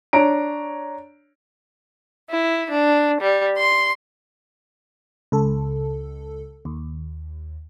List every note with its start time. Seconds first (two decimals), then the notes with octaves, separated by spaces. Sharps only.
0.13 D4 C#5 A#5 D7
2.30 E4
2.71 D4
3.21 G3
3.57 C6
5.32 C#2 A4
6.65 D#2